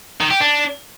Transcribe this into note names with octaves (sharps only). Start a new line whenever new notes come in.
D#3
G4
D4